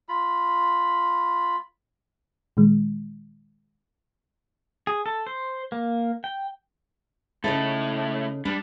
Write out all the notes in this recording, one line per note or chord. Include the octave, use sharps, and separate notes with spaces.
F4 B5
A#2 D#3 G#3
G#4
A4
C5
A#3
G5
C#3 A3 D#4 E4 A4
G3 D4